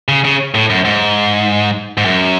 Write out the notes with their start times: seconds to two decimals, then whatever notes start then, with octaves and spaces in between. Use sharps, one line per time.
0.08 C#3
0.25 C#3
0.55 A2
0.70 F#2
0.85 G#2
1.98 G#2
2.05 F#2